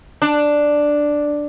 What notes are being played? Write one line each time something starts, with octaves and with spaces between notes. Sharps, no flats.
D4